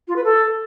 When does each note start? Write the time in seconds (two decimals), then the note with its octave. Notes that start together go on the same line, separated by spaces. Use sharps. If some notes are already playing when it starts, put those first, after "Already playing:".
0.07 F4
0.16 B4
0.24 A4